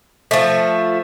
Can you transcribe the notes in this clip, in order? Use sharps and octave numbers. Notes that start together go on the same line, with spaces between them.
F3 A3